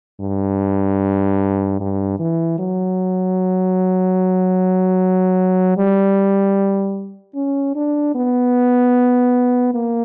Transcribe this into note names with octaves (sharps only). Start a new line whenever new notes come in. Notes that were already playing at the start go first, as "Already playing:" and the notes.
G2
G2
E3
F#3
G3
C#4
D4
B3
A#3